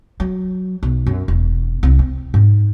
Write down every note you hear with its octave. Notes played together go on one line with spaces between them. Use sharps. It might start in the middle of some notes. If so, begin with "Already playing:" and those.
F#3
B1
F#2
E1
C2
C4
G#2